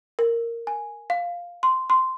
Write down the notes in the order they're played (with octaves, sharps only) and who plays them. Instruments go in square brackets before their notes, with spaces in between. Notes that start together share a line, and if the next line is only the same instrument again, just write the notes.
[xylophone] A#4
G#5
F5
C6
C6